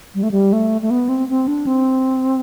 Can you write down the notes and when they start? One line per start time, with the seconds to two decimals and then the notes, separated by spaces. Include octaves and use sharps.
0.15 G3
0.23 A3
0.31 G3
0.53 A3
0.82 A3
0.90 B3
1.09 C4
1.29 C4
1.48 D4
1.67 C4